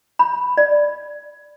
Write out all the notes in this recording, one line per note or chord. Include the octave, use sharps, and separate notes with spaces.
B5
D5